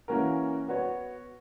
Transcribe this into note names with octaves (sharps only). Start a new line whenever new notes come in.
E3 A#3 C#4 F#4 A#4
B3 F#4 C#5